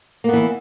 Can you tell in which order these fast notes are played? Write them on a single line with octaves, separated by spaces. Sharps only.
A#3 B3 E3